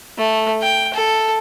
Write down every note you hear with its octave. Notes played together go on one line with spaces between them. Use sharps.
A3
G5
A4